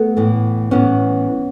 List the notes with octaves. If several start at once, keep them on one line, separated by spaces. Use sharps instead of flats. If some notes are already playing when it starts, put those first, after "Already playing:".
Already playing: A3 B3
A2 E3
A2 E3 B3 C#4